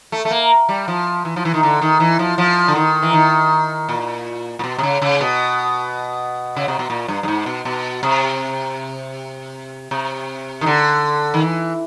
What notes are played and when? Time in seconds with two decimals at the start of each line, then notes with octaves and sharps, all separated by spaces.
0.12 A3
0.25 A3
0.31 A#3
0.69 G3
0.88 F3
1.25 E3
1.36 F3
1.45 E3
1.54 D#3
1.63 D3
1.81 D#3
2.00 E3
2.19 F3
2.38 F3
2.68 D3
2.75 D#3
3.02 E3
3.13 D#3
3.89 A#2
4.59 A#2
4.64 B2
4.78 C3
4.83 C#3
5.02 C#3
5.21 B2
6.56 C#3
6.68 C3
6.79 B2
6.90 A#2
7.08 G2
7.23 G2
7.28 G#2
7.46 B2
7.65 B2
8.03 C3
9.91 C3
10.61 D#3
10.66 D3
11.34 D#3
11.42 E3